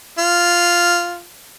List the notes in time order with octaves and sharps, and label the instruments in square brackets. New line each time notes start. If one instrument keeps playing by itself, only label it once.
[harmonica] F4